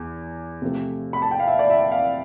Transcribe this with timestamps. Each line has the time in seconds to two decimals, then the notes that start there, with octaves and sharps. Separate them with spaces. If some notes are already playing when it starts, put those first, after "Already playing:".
Already playing: E2
0.62 C3 F3 A3
1.13 B5
1.22 A5
1.31 G5
1.40 F5
1.48 E5
1.59 D5
1.70 E5
1.92 F5